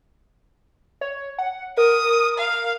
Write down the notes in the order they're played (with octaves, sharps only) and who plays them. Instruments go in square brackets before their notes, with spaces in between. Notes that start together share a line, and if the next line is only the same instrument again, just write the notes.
[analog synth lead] C#5
F#5
[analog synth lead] A#4 [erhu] D#6
[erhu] F5